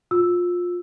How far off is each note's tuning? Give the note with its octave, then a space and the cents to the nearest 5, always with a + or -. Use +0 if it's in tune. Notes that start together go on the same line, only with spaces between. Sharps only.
F4 +20 E6 +0